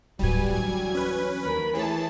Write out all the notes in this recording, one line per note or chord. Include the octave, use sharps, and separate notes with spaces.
D1 A2 F#3 G3 B4 G#5
D2 E3 F#3 G#6
C#4 B4
D#2 A#4 B5
E3 A3 G#4 C#5 A5